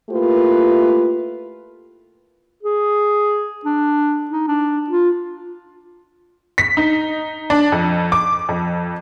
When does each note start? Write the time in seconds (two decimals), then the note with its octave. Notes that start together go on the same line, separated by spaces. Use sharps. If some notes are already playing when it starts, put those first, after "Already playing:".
0.10 A3 A#3 E4 F4 G4 B4
2.63 G#4
3.65 D4
4.31 D#4
4.48 D4
4.90 F4
6.58 B6
6.77 D#4
7.50 D4
7.72 F2
8.12 D6
8.49 F2